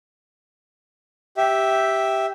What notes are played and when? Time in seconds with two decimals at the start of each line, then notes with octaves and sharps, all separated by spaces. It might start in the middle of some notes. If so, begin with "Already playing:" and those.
1.37 G4 E5